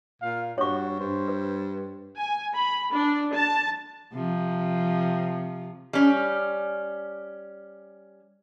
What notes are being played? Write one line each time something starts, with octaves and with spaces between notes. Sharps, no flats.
A#2 F5
G2 F#4 C#5 C#6
G2 C5
B4
G#5
B5
D4
A5
C3 F3
G3 C#4